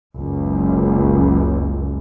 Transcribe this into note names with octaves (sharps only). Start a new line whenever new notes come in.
F#1 C#2